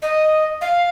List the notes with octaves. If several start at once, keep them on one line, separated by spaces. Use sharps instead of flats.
D#5
F5